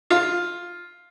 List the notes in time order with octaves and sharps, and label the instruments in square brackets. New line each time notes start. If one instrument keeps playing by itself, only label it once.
[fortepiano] F4